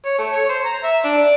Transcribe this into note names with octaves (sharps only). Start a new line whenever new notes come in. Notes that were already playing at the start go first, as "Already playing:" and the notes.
C#5
A3
C#5
C5
A#5
E5
D4
D5